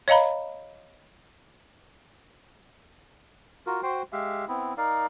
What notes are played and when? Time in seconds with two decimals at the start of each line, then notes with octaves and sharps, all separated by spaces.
0.08 C#5 D#5 F5 A#5 B5
3.67 F4 F#4 A#4
3.83 F#4 C5 G5 C6
4.12 G#3 G4 E5 F5
4.48 B3 C4 E4
4.78 D#4 A#4 D5 F5